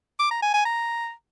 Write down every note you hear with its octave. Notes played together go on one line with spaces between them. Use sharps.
D6
A#5
G#5
G#5
A#5